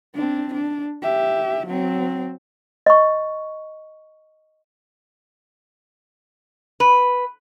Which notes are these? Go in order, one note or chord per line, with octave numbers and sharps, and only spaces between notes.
C4 D4
D4
G4 E5
F#3 C4
D#5 C#6
B4